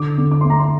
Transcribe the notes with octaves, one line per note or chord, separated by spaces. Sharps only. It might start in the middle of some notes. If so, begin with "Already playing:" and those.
Already playing: D3 D6
D3
D6
A3 C6
A#5
C6